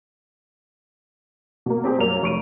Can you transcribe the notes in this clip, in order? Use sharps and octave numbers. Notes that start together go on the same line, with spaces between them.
B2 A#3
C4 G4 G#4 C5
F#2 G3 A#3 F7
F1 C#6 D7 D#7